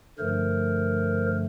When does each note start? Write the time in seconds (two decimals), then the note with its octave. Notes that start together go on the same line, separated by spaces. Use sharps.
0.18 G2 D3 F3 A3 A#4 C5